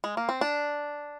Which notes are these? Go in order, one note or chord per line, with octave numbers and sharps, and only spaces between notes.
G#3
A#3
C4
D4